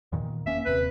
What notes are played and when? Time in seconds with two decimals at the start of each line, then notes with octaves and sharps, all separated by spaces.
0.12 E2 A#2 D#3
0.46 F1 A#3 C#4 E5
0.65 D#1 D#2 C3 B4